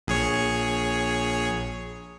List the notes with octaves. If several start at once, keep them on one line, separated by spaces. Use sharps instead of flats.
A#1 G#4 C#5